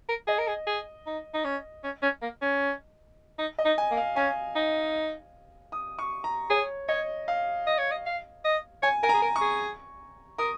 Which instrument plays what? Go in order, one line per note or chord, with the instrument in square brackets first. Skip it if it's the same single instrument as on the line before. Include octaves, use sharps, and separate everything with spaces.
[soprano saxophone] A#4
[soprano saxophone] G#4 [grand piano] D#5
[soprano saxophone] A#4
G#4
G#4
D#4
D#4
C#4
C#4
C#4
A#3
C#4
D#4
[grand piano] D#5
[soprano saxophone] D#4
[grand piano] G#5
[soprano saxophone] A#3
[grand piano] F5
[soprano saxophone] C#4 [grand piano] G#5
[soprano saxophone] D#4
[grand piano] D#6
C#6
A#5
[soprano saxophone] G#4 [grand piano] C#5
[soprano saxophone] C#5 [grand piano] D#5
[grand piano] F5
[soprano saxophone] D#5
C#5
D#5
F5
D#5
[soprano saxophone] C#5 [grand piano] G#5
[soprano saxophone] A#4 [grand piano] G#5
[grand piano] A#5
[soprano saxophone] G#4
A#4
[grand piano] C#6
[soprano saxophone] G#4
[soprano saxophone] A#4 [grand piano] D#6